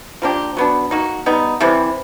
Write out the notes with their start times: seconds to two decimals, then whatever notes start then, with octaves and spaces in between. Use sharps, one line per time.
0.22 F3 A#3 D4 G4
0.57 F#3 B3 D4
0.91 A#3 D#4 F#4
1.26 G3 B3 D#4
1.61 C3 E3 G3